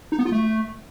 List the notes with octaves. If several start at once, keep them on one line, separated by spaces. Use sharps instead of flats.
D#4
B3
F4
A3